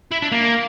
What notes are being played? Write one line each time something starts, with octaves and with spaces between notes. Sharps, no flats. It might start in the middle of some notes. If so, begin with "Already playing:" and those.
E4
D4
A#3